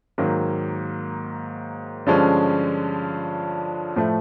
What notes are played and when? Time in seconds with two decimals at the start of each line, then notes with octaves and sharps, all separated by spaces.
0.18 G#2 D#3 F#3 A#3
2.07 G2 D3 F3 G#3 C#4
3.96 A2 F3 A3